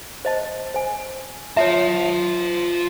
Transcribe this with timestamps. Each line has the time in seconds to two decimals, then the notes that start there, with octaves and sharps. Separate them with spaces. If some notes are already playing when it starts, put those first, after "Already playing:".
0.25 C5 D#5 A5
0.74 C5 G#5
1.57 F4 C#5 E5 A5